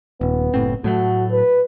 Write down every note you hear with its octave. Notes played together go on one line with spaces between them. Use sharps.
D#1 B3
F#1 A2 C4
A2 F#3 A3 F#4
B4